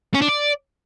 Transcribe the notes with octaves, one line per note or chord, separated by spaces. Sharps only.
C#4
D4
D5